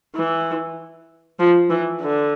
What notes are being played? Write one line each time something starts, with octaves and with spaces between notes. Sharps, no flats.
E3
F3
E3
D3